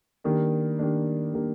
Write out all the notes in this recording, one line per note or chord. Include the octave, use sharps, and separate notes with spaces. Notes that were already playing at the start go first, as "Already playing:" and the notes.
D#3 G3 A#3 D4
D#3 G3 A#3 D4
D#3 G3 A#3 D4